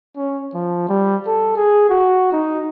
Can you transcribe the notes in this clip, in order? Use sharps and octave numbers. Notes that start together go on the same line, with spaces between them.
C#4
F3
G3
A4
G#4
F#4
D#4